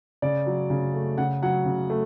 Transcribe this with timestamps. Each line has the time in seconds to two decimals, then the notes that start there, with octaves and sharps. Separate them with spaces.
0.22 C#3 D5
0.46 F#3
0.70 C#3
0.94 A3
1.18 C#3 F#5
1.42 F#3 F#5
1.65 C#3
1.90 A3